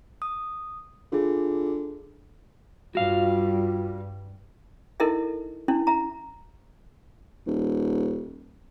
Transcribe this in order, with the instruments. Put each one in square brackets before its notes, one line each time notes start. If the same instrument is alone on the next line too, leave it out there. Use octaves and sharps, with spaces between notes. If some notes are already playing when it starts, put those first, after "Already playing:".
[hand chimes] D#6
[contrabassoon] D3 [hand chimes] F4 G#4
[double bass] G2 G3 [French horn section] F4 [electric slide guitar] F#4 F5
[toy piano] D#4 E4 A4 A#4 D#5 E5
C#4 D4 E4
E5 A#5
[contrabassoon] D#1